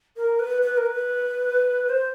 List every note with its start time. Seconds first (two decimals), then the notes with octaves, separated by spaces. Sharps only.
0.17 A#4
0.40 B4
0.62 B4
0.77 A#4
0.86 B4
1.89 C5